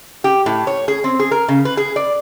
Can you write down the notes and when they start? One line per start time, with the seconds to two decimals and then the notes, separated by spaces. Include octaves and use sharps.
0.24 G4
0.46 A2
0.67 C#5
0.88 G#4
1.04 C4
1.19 G#4
1.31 A#4
1.48 C#3
1.65 B4
1.77 G#4
1.96 D5